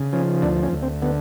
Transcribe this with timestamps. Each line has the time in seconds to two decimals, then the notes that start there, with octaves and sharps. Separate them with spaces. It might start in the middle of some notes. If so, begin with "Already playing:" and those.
Already playing: C#3
0.13 F3 C#4
0.42 D2 D4
0.63 C#4
0.72 D2
0.82 C4
1.02 D3 B3